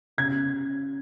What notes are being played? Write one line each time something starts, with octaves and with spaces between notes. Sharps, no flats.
C#3 G#6